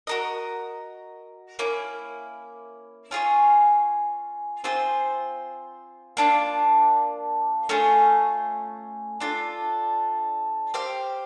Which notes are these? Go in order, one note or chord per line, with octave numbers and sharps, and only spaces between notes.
F#4 A#4 D#5
A#3 C#4 E4
C#4 F4 G#4 C#5
C4 F4 G#4 C5
A#3 D4 F4
A3 C#4 F4 G#4
D4 F4 A4
G4 C5 F5